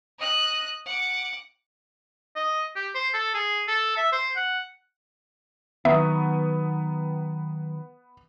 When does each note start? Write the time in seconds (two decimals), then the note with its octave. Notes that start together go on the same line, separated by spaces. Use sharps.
0.19 D#5 F#6
0.85 F#5 D6
2.36 D#5
2.76 G4
2.95 C5
3.14 A4
3.34 G#4
3.68 A4
3.97 E5
4.12 C5
4.36 F#5
5.85 D#3 F#3 B3 E5